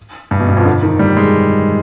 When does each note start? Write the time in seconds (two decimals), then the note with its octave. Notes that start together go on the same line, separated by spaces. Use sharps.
0.31 G2
0.40 B2
0.48 G2
0.57 F2
0.65 D3
0.83 D#3
0.99 G3
1.17 G#3